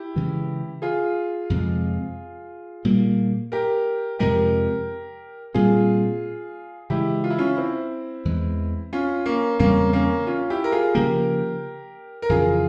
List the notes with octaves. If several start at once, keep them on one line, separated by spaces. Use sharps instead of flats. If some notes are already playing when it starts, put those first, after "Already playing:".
Already playing: E4 G4
C#3 E3 G#3
F4 G#4
F2 C3 F3 G#3
A#2 G3 A#3
G4 A#4
F2 C3 F3 G#3 G4 A#4
A#2 G3 C4 F4 G#4
C#3 E3 G#3 E4 G4
F4
E4
C#4 F4
C4 E4
E2 E3 G#3
C#4 F4
A#3 C#4
E2 C#3 G3 A#3 C4 C#4
A#3 C#4
C#4 F4
E4 G4
A#4
F4 G#4
C#3 F3 A#3 G4 A#4
A#4
F2 C#3 E3 F4 G#4